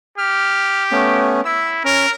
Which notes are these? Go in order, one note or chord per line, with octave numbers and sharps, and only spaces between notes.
G4 F6
A3 B3 C#4
E4 E6
C#4 A#4